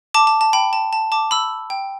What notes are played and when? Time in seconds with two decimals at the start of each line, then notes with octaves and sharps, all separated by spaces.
0.14 A5 D6
0.27 A5
0.41 A5
0.53 G5 B5
0.73 A5
0.93 A5
1.12 A5 D6
1.31 B5 E6
1.70 G5